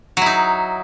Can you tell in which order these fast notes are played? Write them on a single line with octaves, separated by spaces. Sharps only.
F#3 E4 D#4